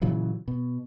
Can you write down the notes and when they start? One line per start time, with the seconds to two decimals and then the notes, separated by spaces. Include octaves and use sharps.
0.02 A#2 C#3 E3 F#3
0.48 B2